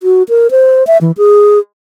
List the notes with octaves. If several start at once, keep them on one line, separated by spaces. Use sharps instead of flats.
F#4
A#4
C5
E5
E3
G#4